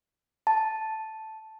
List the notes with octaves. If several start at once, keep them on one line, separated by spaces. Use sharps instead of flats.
A5